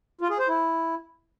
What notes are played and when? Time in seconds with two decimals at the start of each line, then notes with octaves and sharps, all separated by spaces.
0.21 F4
0.30 G#4
0.39 C5
0.48 E4